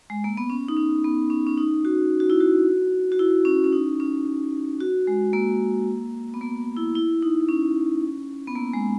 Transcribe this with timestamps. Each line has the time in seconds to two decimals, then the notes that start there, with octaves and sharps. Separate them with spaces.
0.10 G#3
0.24 A#3
0.37 B3
0.50 C#4
0.68 D#4
0.77 C#4
1.04 B3
1.30 C#4
1.47 C#4
1.58 D#4
1.85 F#4
2.20 F#4
2.30 E4
2.40 F#4
3.12 F#4
3.19 E4
3.45 C#4
3.64 C#4
3.72 D#4
4.00 C#4
4.81 F#4
5.07 G#3
5.33 A#3
6.34 B3
6.41 A#3
6.76 E4
6.95 E4
7.22 D#4
7.49 C#4
8.47 B3
8.56 A#3
8.73 G#3